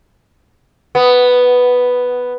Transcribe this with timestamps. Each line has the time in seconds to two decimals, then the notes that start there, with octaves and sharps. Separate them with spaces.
0.95 B3